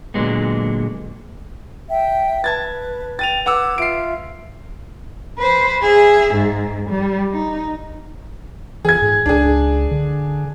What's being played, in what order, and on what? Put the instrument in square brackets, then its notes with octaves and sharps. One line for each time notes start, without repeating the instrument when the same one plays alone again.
[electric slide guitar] A#2 D3 D#3 F#3 G#3 B3
[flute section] E5 G5
[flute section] B4 [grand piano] A5 G#6 A6
[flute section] G5 [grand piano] A6 D#7 F7
[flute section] B4 G#6 [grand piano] F#5 D6 E6
[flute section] F4 E5 [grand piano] C7 D7
[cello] B4 C5
G#4 E5
G#2
G3
D#4
[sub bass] E3 [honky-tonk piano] G#4 G#6
[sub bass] G#2
[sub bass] C#2 [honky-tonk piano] D4 G#4
[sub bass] D3